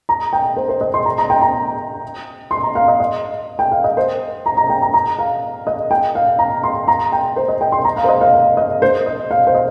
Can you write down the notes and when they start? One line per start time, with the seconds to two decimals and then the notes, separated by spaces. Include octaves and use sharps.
0.09 A#5
0.33 G5
0.57 C5
0.69 C5
0.81 D#5
0.94 C6
1.05 A#5
1.18 A#5
1.30 G5
1.42 A#5
2.51 C6
2.63 A#5
2.75 F5
2.88 D#5
3.00 D#5
3.59 G5
3.72 F5
3.84 D#5
3.97 C5
4.46 A#5
4.57 A#5
4.70 G5
4.82 A#5
4.94 A#5
5.19 F5
5.67 D#5
5.91 G5
6.15 F5
6.39 A#5
6.63 C6
6.88 A#5
7.12 G5
7.36 C5
7.48 D#5
7.61 G5
7.72 C6
7.85 A#5
7.97 F5
8.04 C5
8.09 D#5
8.21 F5
8.33 F5
8.57 D#5
8.82 C5
9.06 D#5
9.31 F5
9.47 C5
9.55 D#5